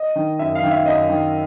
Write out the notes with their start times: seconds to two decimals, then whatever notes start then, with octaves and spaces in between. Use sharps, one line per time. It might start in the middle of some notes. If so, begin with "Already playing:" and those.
Already playing: D#5
0.16 D#3
0.39 F#2 E5
0.55 F5
0.62 D#3
0.71 E5
0.86 F#2 D#5
1.09 D#3